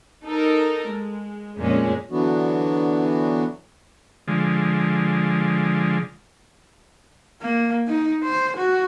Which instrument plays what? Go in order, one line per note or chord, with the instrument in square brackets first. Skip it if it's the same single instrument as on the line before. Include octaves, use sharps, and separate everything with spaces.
[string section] D#4 A4 A#4
G#3
F2 A#2 G#3 C#4
[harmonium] D3 E3 F#3 B3 D4 F#4
[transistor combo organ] D3 F3 G#3
[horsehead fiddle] A#3
D#4
C5
F#4